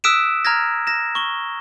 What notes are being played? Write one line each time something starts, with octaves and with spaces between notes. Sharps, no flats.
D#6 E6 F#6 B6 D7 E7
A#5 F6 G#6 A#6
A#6 E7
C#6 G7